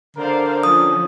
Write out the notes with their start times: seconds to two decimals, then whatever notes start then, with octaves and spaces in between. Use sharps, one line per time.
0.17 D3 A#4 C5 D5 F5
0.63 F3 C#4 D#6